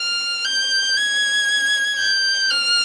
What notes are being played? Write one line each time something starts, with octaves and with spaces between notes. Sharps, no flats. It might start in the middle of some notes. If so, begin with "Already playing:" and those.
Already playing: F6
G6
G#6
G6
F6